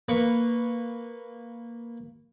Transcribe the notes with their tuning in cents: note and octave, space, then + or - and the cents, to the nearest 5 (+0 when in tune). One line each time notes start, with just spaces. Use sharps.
A#3 +0 B4 +0 C#6 +0